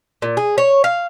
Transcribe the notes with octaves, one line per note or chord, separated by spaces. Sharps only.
A#2
G#4
C#5
F5